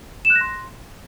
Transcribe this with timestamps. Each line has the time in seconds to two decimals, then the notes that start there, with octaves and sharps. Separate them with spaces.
0.25 E7
0.30 F#6
0.36 A#6
0.41 C6